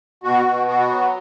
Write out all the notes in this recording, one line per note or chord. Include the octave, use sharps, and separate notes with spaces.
B2 F#4
B2
B3 F#4
F#3